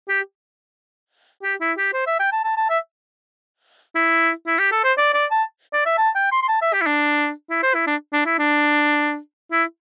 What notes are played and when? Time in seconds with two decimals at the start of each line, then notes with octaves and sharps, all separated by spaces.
0.09 G4
1.43 G4
1.61 E4
1.78 G4
1.94 C5
2.07 E5
2.20 G5
2.32 A5
2.44 A5
2.57 A5
2.70 E5
3.96 E4
4.47 E4
4.59 G4
4.72 A4
4.84 C5
4.98 D5
5.14 D5
5.31 A5
5.73 D5
5.86 E5
5.98 A5
6.16 G5
6.32 C6
6.43 C6
6.49 A5
6.61 E5
6.74 G4
6.81 E4
6.87 D4
7.50 E4
7.63 C5
7.75 E4
7.87 D4
8.13 D4
8.25 E4
8.39 D4
9.52 E4